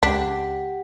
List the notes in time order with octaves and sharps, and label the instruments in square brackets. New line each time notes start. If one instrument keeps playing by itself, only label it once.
[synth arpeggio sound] C#2 [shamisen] D4 [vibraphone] G4 F#5 G5 [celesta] B6